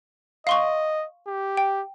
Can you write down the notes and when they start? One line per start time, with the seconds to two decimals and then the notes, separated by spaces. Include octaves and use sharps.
0.47 D#5 F5 C6 C#6
1.27 G4
1.57 G5